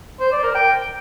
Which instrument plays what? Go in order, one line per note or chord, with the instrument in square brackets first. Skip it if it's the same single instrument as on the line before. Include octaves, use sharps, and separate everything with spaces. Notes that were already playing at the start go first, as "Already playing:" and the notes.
[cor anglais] C5
D5
A#4
G5